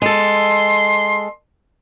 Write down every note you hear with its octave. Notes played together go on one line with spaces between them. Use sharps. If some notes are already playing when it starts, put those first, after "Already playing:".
G#3 A4 C6